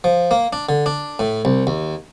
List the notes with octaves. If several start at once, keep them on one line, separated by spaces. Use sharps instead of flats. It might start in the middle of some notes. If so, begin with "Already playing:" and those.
F3
A#3
D4
D3
D4
A2
C2
D#2